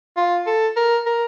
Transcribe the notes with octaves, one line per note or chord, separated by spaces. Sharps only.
F4
A4
A#4
A#4